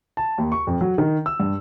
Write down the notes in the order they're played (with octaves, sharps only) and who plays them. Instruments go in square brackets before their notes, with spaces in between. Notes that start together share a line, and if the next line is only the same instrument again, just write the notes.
[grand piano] A5
D#2
C#6
F2
F#3
D#3
E6
G2